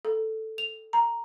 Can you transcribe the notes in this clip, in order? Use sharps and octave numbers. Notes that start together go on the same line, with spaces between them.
A4
F7
A#5